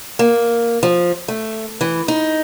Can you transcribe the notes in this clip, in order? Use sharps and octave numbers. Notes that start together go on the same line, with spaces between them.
A#3
F3
A3
E3
D#4